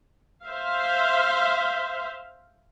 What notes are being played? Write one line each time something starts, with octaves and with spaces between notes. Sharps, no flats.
C5 E5 F5